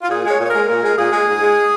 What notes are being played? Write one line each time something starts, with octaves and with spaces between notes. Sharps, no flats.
F4
A#2 G#4
G#3 C#5
A#2
C#5
G#3 A#4
A#2 A#4
G#3
A#2 G#4
G#3
G#2
G#3